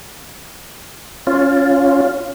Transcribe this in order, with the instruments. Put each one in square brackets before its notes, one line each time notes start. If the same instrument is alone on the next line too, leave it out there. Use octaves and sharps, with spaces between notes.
[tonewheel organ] C#4 F4